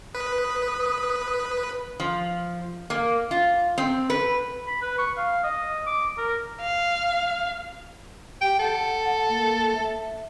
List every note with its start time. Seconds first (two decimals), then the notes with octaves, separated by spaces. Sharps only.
0.15 B4 D#6
2.00 F3
2.90 A#3
3.31 F4
3.78 C4
4.10 B4
4.67 B5
4.82 B4
4.98 C#6
5.17 F5
5.43 D#5
5.86 D6
6.18 A#4
6.60 F5
8.41 G4 G5
8.59 A4 F#5
9.28 A#3
9.75 E5